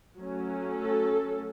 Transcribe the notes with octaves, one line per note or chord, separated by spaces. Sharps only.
F#3 A3 C#4
A4